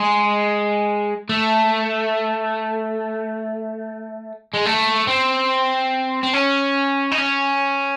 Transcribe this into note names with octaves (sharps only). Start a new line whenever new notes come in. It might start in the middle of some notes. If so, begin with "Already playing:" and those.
Already playing: G#3
A3
G#3
A3
C4
C4
C#4
D#4
C#4